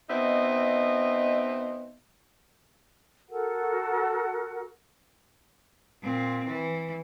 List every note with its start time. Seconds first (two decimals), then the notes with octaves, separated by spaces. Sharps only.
0.08 B2 C4 D#4 D#5 E5
3.29 F#4 A4 A#4 F#5
6.02 A#2 C4
6.47 E3